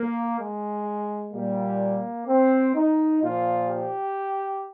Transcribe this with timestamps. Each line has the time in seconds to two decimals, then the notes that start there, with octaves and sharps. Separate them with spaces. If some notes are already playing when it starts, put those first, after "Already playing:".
Already playing: A#3
0.40 G#3
1.33 A#2 G3 A#3
2.28 C4
2.75 D#4
3.21 A#2 F3 F4
3.69 G4